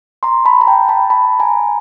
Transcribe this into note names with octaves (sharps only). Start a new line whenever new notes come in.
A#5 C6
A5 B5
A#5
G5 A5
A5 B5
A5 B5
G#5 A#5